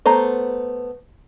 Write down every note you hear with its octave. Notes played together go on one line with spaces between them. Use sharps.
A3 B3 C5 A#5